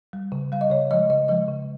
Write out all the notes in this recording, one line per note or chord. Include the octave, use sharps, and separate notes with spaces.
G3
C#3
G3 F5
D#5
C#3 C#5
F3 G#3 D#5
C#3 D#5
F3 G#3 D#5
C#3